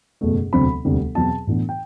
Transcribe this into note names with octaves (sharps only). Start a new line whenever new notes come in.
F#1 E2 B2 A3
E1 D2 C3 F#3 C4 B5
E1 D2 C3 G3
E2 B2 F#3 C4 A5
A2 E3 B3 D4
G5